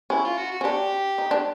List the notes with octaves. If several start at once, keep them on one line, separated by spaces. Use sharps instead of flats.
C#4 E4
F4
F#4
F#4
C#4
D4 G4
D#4
D4